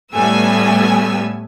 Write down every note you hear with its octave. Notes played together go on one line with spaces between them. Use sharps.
A2 G3 A3 B3 G#5 E6